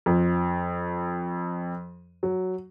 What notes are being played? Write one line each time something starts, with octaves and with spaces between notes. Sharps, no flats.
F2
F#3